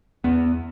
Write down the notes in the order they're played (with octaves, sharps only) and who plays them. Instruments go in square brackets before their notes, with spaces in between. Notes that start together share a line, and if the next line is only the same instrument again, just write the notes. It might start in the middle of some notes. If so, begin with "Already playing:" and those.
[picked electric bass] E2 B3